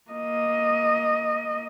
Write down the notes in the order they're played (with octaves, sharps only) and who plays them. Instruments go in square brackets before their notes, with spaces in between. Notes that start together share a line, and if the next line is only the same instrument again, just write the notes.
[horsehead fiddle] A#3 D#5